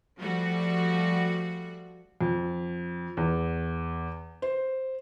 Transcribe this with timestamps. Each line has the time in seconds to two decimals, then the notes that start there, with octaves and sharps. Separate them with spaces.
0.18 F3 G3 A3 F#4
2.21 F2
3.17 E2
4.42 C5